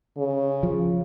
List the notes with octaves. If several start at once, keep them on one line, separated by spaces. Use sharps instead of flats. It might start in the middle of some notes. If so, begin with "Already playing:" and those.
C#3
F3